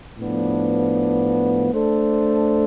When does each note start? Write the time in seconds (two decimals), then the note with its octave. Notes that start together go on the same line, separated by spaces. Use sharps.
0.17 A2 F3 B3 D4
1.74 A3 D4 A4 C5